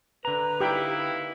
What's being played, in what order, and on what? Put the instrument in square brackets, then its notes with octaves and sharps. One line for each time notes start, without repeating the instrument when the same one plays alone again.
[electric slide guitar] D3 A#5 [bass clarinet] B4
[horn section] A#3 D#4 E4 [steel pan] G4 G5 B5